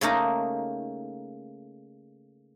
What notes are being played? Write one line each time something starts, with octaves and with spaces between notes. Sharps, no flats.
C#3 A3 A#3 D#4